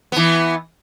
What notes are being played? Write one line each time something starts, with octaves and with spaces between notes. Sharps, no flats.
E3 B3